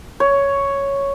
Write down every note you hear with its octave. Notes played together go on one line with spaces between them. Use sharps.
C#5